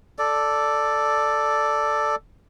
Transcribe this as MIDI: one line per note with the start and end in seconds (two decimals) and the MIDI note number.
0.19 2.15 69
0.19 2.15 74